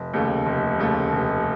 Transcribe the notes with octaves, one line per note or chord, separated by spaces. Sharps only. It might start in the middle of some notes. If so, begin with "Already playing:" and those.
Already playing: F1
D#2 C#3 A3
F1
D#2 C#3 A3
F1